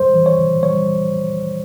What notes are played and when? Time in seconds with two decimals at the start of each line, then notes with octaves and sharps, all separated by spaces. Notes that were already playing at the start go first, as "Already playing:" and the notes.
Already playing: G3 C5
0.14 E3
0.26 C#5
0.39 C#3
0.63 G3 C#5